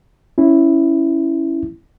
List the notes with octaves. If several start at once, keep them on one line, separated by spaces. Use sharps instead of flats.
C#4 E4